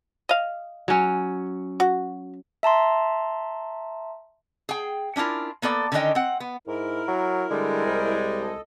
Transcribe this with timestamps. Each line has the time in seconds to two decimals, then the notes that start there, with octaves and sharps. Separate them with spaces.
0.29 D#5 F5
0.88 F#3 C#4
1.80 F#4
2.63 E5 A5 A#5 C6
4.69 G#4 G5
5.16 C#4 D4 E4 F4 A#4
5.62 A#3 B3 A4 D5
5.92 D3 D#3 C#4 D4 D#5 G5
6.15 C4 F#5
6.40 B3
6.68 G#2 E4 A#4
7.08 F#3
7.50 D3 G3 G#3
7.86 C2
8.41 A4 D#5